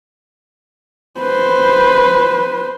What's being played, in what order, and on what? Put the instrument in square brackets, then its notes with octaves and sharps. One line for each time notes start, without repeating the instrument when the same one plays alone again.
[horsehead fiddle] B4 C5